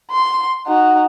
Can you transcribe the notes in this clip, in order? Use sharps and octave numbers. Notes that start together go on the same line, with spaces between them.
C6
D#4 F#4